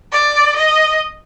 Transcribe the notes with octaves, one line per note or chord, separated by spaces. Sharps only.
D5
D#5